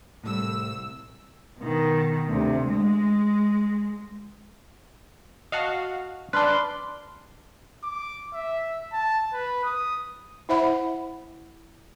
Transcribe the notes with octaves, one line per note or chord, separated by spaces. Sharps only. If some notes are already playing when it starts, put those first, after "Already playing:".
C2 A2 G3 E6
B2 D#3
D2 C3
G#3
F#4 D#5 F5 A5
D4 B4 D5 A5 C6 F6 F#6
D6
E5
A5
B4
D#6
E4 C5 E5 F#5 B5